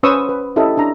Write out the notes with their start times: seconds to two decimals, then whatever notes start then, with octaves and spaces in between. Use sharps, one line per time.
0.03 C#4 B4 C5 C#6 D#6 E6
0.29 B4
0.56 C#4 E4 G4 A4 D#5
0.77 D4 A#5